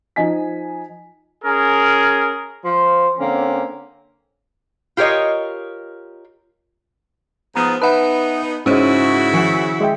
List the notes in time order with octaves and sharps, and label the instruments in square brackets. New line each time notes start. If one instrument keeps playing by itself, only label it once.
[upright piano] F3 D#4 D#5 G#5 B6
[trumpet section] C#4 G#4 A#4
[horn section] F3 C6
D3 A#3 C4 C#4 A#4
[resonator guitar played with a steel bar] F4 G4 A#4 C#5 D#5
[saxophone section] G#2 F3 B3 [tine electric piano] A#5 D#6
[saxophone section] B3 D#4 [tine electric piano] B4 E5 F#5 [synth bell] A5 B5
[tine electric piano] G#2 G#3 [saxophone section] C#3 E4 F#4 [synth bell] C#4 C5 C#5
[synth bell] D#3 F3 C#7
[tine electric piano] G#3 E5 G5